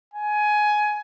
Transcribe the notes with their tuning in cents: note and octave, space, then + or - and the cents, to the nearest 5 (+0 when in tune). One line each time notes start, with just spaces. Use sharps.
G#5 +15